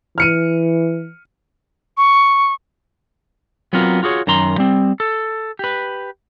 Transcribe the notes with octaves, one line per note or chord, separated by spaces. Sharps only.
E3 F6 C#7 D#7
C#6
F#3 B3 C4 F4 A#4
F4 F#4 G#4 C#5
F#2 D#3 A#5 C6
G3 C4
A4
G4 B4